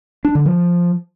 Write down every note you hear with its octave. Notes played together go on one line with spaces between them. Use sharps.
D4
D3
F3